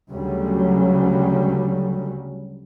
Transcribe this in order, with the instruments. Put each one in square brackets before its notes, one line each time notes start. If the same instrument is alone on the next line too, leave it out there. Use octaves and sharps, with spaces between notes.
[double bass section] D2 C#3 F#3 G3